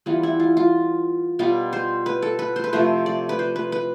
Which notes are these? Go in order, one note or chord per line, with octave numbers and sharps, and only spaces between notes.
E3 G3 B3 F4
E4
F4
F4
B2 G3 B3 F4
C5
B4
A4
B4
C5
B4
C3 F3 A3 C5
D5
B4
C5
B4
B4